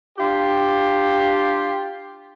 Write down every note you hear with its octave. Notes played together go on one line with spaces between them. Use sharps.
D4 F4 G4